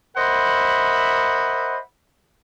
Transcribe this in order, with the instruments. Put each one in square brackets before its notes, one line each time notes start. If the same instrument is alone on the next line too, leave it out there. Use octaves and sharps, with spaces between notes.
[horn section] A#4 C5 D#5 E5 F#5 B5